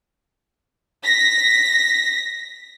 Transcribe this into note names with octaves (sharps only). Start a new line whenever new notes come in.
A#6 B6